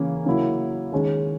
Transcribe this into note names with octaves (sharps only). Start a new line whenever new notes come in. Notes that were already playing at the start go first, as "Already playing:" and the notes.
Already playing: C#3 E3 A#3 C#4
C#3 F#3 A#3 E4
D#3 G#3 C#4